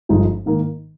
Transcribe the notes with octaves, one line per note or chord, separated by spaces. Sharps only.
G1 G2 F3 G#3 D#4
G#2 D#3 A#3 D#4 A#4